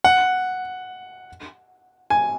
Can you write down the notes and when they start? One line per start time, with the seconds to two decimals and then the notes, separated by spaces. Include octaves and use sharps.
0.04 F#5
2.10 G#5